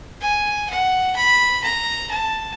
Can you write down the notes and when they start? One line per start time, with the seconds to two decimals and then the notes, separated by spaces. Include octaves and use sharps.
0.22 G#5
0.70 F#5
1.16 B5
1.64 A#5
2.11 A5